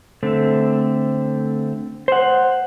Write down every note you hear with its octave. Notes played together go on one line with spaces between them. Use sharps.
D3 A3 C4
C5 F#5